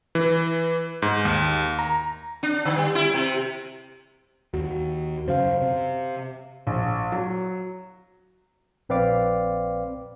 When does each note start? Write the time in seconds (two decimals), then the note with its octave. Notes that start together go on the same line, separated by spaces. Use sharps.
0.15 E3
1.02 G#2
1.25 D#2
1.79 A#5
2.43 D4
2.65 D3
2.77 G3
2.95 E4
3.14 C3
4.54 D#2 F#4
5.28 F#2 C#3 C5 F5
5.62 C3
6.67 A#1
7.12 F#3
8.89 A#1 C4 B4 D5 F5 D6